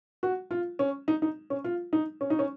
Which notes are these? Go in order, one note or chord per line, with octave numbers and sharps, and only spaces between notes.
F#4
F4
C#4
D#4
D#4
C#4
F4
D#4
C#4
D#4
C#4